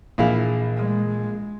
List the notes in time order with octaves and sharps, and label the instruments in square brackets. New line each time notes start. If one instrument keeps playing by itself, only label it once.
[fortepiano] A#1 E4 F5 [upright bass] A#2 E3 [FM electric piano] A#3 G#4
[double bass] G#3